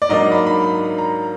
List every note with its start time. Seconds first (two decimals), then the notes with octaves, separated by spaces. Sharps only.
0.02 D5
0.09 G#2 F#3 A#3 D4 D#5
0.32 B5
0.47 B5
0.98 A#5